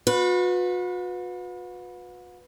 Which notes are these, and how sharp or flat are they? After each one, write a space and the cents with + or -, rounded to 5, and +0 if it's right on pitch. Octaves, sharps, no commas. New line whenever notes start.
F#4 -45 B4 +0